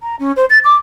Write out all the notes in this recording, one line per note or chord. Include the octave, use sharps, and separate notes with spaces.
A#5
C#4
C5
A6
D6